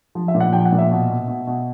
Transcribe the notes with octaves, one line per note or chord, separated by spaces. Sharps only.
F3
E5
A#2
F#5
F3 G5
F#5
A#2
E5
B2
B2
B2
B2